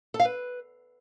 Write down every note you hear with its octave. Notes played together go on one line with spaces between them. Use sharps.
A4
F5
B4